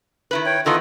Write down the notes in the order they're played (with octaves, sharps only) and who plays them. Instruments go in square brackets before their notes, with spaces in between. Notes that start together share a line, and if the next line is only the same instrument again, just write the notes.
[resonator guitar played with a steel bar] D#3 E4 B4
[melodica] C#5 G5
[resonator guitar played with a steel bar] D#3 E3 B3 [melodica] F4 A4 D#5